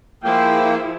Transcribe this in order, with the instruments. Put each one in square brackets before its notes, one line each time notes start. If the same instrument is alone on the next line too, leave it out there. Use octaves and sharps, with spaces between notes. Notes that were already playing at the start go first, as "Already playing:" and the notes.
[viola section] F3 E4 G#4 [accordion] A#3 [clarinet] G5